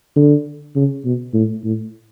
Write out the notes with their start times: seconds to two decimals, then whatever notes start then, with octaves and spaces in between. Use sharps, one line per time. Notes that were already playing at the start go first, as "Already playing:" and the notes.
0.17 D3
0.76 C#3
1.05 B2
1.34 A2
1.64 A2